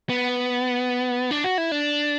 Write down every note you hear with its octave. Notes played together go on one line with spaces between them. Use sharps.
B3
D4
F#4
E4
D4